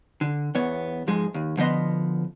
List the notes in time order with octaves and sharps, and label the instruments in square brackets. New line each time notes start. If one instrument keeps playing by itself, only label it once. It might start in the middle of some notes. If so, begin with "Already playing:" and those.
[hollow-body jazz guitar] D3
E2 B3 C#5
G#2 F3 G#3 G#4
D#2
D3 F3 B3 D#5 C6